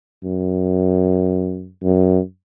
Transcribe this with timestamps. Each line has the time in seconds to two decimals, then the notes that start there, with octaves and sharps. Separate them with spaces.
0.24 F#2
1.83 F#2